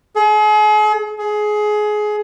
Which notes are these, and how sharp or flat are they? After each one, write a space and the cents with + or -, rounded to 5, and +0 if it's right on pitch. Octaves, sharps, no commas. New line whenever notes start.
G#4 +40
G#4 +20